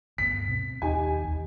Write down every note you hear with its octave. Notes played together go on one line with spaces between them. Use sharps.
D2 G2 B3 B6
B2 B3 C4
D#2 D#4 G4 G#5
D#2